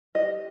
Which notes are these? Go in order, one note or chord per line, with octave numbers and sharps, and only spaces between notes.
G4 D#5